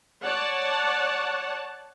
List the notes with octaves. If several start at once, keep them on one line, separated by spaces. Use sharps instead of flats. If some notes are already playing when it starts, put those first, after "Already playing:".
C#5 D5 F#5 A5